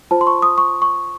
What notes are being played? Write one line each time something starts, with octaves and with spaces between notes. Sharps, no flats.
F4 C5 A5
C6
C#6
D#6
C#6
C#6